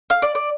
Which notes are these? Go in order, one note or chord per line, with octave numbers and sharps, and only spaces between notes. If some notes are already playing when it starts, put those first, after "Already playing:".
F5
D5
D5